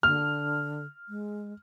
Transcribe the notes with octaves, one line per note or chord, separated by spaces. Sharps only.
D3 F6
G#3